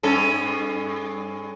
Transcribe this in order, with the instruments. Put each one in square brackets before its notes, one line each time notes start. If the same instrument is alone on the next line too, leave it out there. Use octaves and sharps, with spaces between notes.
[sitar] G2 C#4 A4